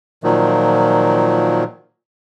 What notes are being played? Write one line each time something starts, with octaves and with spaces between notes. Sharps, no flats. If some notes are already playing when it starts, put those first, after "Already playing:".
A#2 D#3 F3 F#3